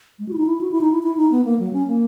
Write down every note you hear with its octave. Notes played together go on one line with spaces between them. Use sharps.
G#3
F#4
E4
D#4
E4
F#4
E4
D#4
E4
E4
D#4
B3
A#3
F#3
C#4
A#3